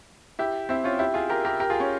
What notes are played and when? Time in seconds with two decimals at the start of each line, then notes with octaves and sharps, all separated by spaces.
0.39 E4 G4
0.69 C4 E4
0.84 C#4 F4
0.99 E4 G4
1.14 F4 G#4
1.30 G4 A#4
1.45 G4 A#4
1.60 G4 A#4
1.70 F4 G#4
1.80 C#4